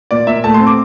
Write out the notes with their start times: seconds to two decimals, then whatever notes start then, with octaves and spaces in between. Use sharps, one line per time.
0.11 A#2 D5
0.27 A#2 E5
0.44 A3 A5
0.54 C6
0.60 C4
0.67 D6